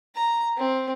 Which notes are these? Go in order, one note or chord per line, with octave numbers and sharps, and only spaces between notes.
A#5
C4